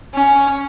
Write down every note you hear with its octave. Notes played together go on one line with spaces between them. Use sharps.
C#4